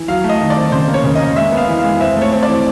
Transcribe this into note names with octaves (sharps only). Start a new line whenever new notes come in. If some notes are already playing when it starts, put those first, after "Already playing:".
Already playing: E3
F#3 F5
A3
D#5
D#3
D5
C4
C#3 C5
A#3
C#5
C#3
A#3 D#5
G#3 E5
B3
F5
E3
F5
G#3
C4 E5
A3 C#5
C4
D5
E3